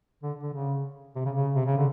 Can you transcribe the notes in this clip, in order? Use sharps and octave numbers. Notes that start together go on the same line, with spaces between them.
D3
D3
C#3
C3
C#3
C#3
C3
C#3
D3